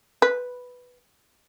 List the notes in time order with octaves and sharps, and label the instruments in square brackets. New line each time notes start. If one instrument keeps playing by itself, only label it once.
[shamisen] B4